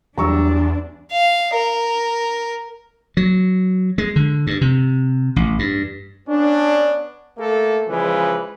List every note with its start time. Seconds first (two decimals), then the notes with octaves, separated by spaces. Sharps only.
0.18 E2 F#3 G3 D4 A#5 C#6 E6
1.12 F5
1.54 A#4
3.17 F#3
3.98 G#3
4.16 D3
4.47 G2
4.61 C3
5.36 A1
5.59 G2
6.29 B3 C#4 D4
7.38 A3 A#3 A4
7.88 C#3 E3 F3 G#3 B4